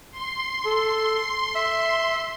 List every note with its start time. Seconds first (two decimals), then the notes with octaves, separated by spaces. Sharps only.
0.11 C6
0.65 A4
1.55 E5